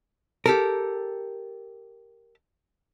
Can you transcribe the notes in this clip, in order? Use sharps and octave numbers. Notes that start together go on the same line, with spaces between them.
G4 A4 A#4